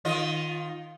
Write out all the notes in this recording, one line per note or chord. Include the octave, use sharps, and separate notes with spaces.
D#3 F4 D#5